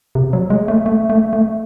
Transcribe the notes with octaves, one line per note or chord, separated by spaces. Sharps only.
C3
F#3
G#3
A3
A3
A3
A3